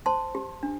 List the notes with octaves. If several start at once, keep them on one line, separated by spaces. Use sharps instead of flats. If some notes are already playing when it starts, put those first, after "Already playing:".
C5 A5 C6
G4
D4